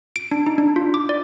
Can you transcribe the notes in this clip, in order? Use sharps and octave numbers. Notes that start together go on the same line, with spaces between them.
D7
D4
D#4
D4
F4
D6
D5